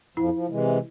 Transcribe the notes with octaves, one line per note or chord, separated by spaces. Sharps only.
F2 F3 E4
F3
C3 E3 G#3